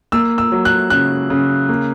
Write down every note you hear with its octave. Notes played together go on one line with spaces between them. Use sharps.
A#3 E6
E6
F#3
F#6
C#3 F#6
C#3
A#3